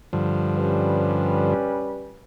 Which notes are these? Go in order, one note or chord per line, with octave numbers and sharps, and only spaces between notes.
G2 D3 F3
G3 C#4 B4